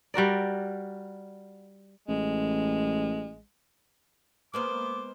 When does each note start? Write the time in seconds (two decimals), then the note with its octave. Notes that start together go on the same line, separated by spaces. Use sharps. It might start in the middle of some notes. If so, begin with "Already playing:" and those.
0.14 G3 F#4 A#4 D5
2.08 A1 G#3
4.54 G#3 A#3 B3 C5 D6